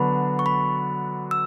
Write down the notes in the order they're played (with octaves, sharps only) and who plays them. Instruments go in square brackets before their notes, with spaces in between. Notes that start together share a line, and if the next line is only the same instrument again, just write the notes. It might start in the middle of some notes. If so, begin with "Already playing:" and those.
Already playing: [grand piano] D3 F#3 B3 D4 F#4 [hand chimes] B5
[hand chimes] C#6
B5
E6